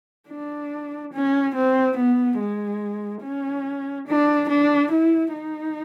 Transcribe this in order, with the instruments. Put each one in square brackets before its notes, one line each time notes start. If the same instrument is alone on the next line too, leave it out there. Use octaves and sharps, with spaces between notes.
[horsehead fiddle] D4
C#4
C4
B3
G#3
C#4
D4
D4
E4
D#4